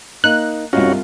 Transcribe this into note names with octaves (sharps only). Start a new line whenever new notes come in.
A#3 D#4 F#6
C2 G2 G#3 C#4 D#4 F4 F#4